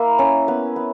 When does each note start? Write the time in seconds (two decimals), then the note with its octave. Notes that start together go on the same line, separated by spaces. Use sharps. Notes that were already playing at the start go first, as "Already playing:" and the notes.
Already playing: A#3 E4
0.19 C#4
0.48 B3
0.76 B3